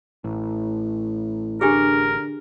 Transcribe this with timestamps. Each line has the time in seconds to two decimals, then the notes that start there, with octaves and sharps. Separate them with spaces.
0.24 A1 A2
1.61 D3 D4 G4 G#4 A#4